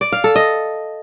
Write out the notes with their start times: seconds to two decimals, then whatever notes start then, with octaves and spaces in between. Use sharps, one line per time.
0.01 D5
0.12 F5
0.24 A4
0.36 D#5